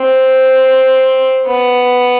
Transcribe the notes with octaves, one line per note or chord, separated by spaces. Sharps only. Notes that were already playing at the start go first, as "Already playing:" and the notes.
Already playing: C4
B3